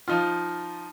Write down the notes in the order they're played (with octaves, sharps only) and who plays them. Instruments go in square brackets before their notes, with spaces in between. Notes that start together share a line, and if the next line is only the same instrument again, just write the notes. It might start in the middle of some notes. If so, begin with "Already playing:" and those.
[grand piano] F3 D#4 F4